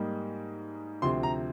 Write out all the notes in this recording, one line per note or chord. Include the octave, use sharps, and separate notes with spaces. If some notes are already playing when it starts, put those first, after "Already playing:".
Already playing: G#2 G3 A#3 D#4
D2 C3 F3 C4 C6
A#5